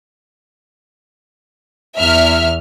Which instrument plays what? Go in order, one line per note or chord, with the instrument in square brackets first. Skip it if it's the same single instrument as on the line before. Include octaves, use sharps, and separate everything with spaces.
[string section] E2 F6 [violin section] E5